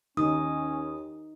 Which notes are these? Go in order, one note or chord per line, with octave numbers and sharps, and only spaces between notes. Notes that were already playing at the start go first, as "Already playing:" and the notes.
D#2 C#4 D#4 D#6